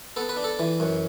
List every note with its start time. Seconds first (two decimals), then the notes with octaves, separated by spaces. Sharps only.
0.16 B3 A4
0.29 B4
0.37 D4
0.44 A4
0.59 E3
0.80 F#2